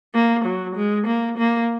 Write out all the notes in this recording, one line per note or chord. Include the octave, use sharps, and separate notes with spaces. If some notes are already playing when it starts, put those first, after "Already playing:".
A#3
F#3
G#3
A#3
A#3